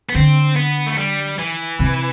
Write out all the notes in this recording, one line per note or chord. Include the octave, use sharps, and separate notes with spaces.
B3
D3 C4
B3
A3
G3
E3
C3